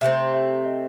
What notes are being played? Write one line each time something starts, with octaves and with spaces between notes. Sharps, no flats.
C3 F3 A3 C4 E5
E5
D#5